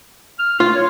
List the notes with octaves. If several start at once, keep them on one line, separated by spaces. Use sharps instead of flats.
F6
A3 F4
C#5